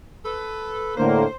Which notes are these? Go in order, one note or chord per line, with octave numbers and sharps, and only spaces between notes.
A4 B4
A2 D3 A#3 C5